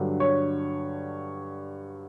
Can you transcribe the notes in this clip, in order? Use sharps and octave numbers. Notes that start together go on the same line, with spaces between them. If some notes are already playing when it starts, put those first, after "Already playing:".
Already playing: G2 D3 F#3
C#5